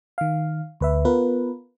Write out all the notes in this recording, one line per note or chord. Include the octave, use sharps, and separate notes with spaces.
D#3 F5
D2 B4 E5
B3 F4 A#4 B4